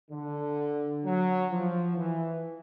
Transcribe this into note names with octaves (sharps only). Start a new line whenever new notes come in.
D3
F#3
F3
E3